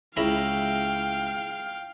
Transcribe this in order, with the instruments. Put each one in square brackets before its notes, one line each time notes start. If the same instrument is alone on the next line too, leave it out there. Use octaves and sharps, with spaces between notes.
[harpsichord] C#2 E4 A#5 [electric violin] F5 G5